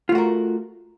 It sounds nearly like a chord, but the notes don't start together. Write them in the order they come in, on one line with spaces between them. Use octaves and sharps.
F4 A3 F#4 A#4